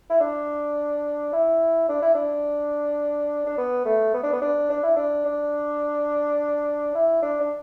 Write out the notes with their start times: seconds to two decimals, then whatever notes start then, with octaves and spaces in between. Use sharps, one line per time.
0.10 E4
0.20 D4
1.33 E4
1.89 D4
2.02 E4
2.15 D4
3.46 D4
3.58 B3
3.85 A3
4.14 B3
4.23 D4
4.32 B3
4.42 D4
4.70 D4
4.83 E4
4.96 D4
5.26 D4
6.95 E4
7.22 D4
7.40 D4